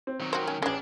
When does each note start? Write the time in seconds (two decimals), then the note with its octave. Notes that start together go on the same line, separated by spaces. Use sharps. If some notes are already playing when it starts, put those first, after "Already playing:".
0.07 C4
0.20 D#3 F#3
0.33 F#4 A#4 C5 G5
0.48 C#4
0.62 A1 D#3 E3 C#4 D4 G#4